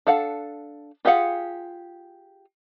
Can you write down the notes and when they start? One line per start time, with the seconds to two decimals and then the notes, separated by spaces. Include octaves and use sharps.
0.07 D4 A4 F5 F#5
1.05 F4 G4 G#4 F5 F#5